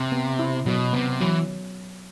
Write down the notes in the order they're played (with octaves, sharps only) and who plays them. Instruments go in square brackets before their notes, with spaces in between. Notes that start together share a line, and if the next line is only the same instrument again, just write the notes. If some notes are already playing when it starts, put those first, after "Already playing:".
Already playing: [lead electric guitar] C3
[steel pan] B3
E4
[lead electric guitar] B2 [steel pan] F#3
[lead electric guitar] C3 [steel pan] B3
[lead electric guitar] E3 [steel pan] F#3